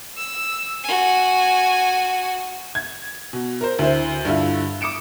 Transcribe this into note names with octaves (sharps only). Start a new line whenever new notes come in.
E6
F#4 G#5
G#6
B2
A#4 C5
D2 E4 C5
G2 D3 E4 F4
D6 D#6 C#7 D7 E7